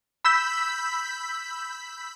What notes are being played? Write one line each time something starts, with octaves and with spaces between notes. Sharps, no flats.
B5 E6 G6 B6